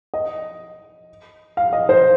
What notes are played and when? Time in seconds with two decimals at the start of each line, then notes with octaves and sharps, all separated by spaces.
0.14 D#5
1.57 F5
1.73 D#5
1.89 C5